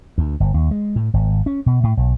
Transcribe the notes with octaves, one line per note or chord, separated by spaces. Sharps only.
D2
G1
D#2
G#3
A2
G#1
C#4
B2
A2
B1